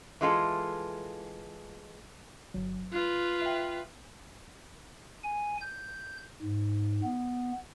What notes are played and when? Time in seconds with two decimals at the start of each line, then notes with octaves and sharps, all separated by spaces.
0.21 E3 G#3 F4 A4
2.54 G1 F#3
2.93 F4 B4 F#6
3.41 E5 G5
5.24 G#5
5.61 G6
6.42 G#2
7.03 B3